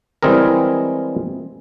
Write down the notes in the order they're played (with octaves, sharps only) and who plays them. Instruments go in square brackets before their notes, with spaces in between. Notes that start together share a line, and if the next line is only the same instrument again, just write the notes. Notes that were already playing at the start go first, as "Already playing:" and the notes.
[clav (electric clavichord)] E3 G3 G#3 C4 G#4 A#4